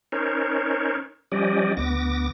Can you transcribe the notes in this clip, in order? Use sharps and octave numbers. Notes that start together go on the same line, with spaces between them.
C#4 D#4 A#4 C5 C#5
F3 G3 C#4 G4 D5 D#5
D2 B3 D6 A#6